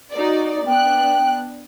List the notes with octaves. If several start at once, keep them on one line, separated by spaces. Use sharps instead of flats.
D#4 F#4 D5
B3 D4 G5 F#6